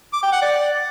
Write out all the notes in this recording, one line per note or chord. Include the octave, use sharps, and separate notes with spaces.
D6
G5
F#5
D5